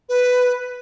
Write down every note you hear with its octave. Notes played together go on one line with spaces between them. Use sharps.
B4